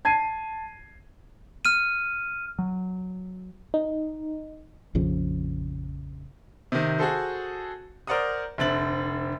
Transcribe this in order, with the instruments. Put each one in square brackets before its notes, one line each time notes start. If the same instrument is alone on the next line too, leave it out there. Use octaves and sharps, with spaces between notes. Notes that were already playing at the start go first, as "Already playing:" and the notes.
[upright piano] A5 G#6 C7 D#7
[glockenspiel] F6 D#7
[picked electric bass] F#3
[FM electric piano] D#4
[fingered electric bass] A#1 F2 C#3 F3
[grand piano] C3 D#3
F#4 G#4 A4 C5
A#4 C5 D5 F#5 A#5 D#6
F1 D3 C4 E5 A6 F#7